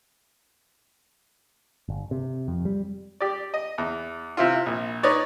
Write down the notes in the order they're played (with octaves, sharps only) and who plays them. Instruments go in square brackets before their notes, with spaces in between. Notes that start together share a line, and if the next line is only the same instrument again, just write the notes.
[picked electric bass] G1
C3
F2
G3
[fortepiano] G4 D5
D#5
E2
C3 E4 F4
A#1
D#4 B4 C#5 D5